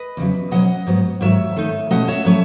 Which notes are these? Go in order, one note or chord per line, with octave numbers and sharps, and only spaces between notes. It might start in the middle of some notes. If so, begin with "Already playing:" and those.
Already playing: B4 D#5
E2 C#3 F#3
B2 F#3 C#4 D#5 F#5
G#2 F#3 B3
G#2 D#3 F#3 C#5 E5
D#3 A3 D#4
B2 A3 C#4 D#5 F#5
C#5 E5
A2 F#3 A3 C#4 C#5 E5